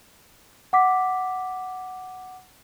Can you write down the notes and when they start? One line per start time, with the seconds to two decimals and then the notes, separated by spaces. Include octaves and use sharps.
0.73 F#5 D6 B6